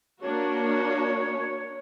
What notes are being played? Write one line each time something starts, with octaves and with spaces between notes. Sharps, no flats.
A#3 D4 F#4 C#5